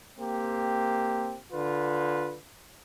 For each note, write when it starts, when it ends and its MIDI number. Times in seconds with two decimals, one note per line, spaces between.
0.18 1.37 58
0.18 1.37 60
0.18 1.37 67
1.53 2.36 50
1.53 2.36 65
1.53 2.36 71